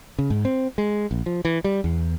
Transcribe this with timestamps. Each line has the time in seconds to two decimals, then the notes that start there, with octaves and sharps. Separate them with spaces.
0.19 C#3
0.30 G#2
0.45 C4
0.78 G#3
1.11 A#1
1.26 F3
1.45 E3
1.64 G3
1.84 E2